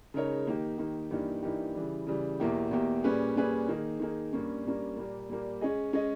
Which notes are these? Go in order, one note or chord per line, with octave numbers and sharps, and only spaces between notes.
C#3 G#3 D#4 A#4 C#5
D#3 A#3 D#4 G4
D#3 A#3 D#4 G4
G2 E3 A#3 D#4 G4
G2 E3 A#3 D#4 G4
C#3 E3 G3
C#3 E3 G3
E2 B2 A#3 E4 G4
E2 B2 A#3 E4 G4
A#2 G3 C#4 G#4 B4
A#2 G3 C#4 G#4 B4
D#3 A#3 D#4 G#4
D#3 A#3 D#4 G#4
G2 G3 A#3 C#4
G2 G3 A#3 C#4
A#2 G3 A#3
A#2 G3 A#3
G#3 C#4 G#4 D#5
G#3 C#4 G#4 D#5